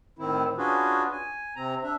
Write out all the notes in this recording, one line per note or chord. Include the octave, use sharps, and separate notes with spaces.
A2 D#3 C4 E4
C#4 D4 F4 F#4 G#4 B4
G#5
C3 C4 A#5
D4 E5